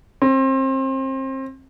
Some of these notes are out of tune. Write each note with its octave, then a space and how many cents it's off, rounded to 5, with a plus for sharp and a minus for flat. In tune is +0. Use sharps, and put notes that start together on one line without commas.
C4 +30